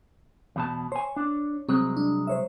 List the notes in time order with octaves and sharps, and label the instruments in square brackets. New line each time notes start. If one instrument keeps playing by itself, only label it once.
[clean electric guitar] E2 B2 A5
[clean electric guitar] C5 G#5 [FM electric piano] C#5
[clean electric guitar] D4
[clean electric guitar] C2 F#3 G#3 [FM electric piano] C4
[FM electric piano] D4
C5 C#5 E5